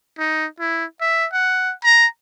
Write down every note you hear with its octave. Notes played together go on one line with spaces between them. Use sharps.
D#4
E4
E5
F#5
A#5